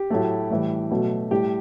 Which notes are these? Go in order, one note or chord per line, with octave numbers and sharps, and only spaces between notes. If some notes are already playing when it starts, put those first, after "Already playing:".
Already playing: G4
A2 F#3 A3
A2 E3 G3
B2 F#3 A3
A2 G3 G4